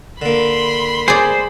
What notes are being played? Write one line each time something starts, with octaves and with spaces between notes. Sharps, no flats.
D3 A#3 B5 C6
G#4 C5 D5